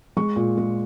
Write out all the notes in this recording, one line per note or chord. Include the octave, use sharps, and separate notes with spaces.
G#3 C#6
A#2
G#3